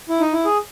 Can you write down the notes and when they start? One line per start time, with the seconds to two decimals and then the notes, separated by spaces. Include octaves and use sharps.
0.09 E4
0.20 D#4
0.33 E4
0.45 G#4